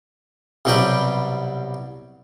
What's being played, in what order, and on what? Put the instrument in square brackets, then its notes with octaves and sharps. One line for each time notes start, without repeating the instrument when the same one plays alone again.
[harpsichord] C2 B2 F#3 G3 B4 G5